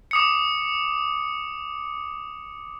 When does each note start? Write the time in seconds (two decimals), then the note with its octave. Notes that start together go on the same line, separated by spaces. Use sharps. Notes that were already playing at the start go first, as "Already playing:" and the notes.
0.11 D6 D#6 C#7